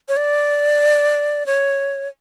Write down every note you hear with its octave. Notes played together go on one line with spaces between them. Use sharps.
C#5
D5
C#5